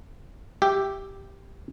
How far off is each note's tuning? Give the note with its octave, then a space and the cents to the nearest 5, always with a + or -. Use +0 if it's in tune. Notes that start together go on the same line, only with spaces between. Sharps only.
G4 +0 E5 +5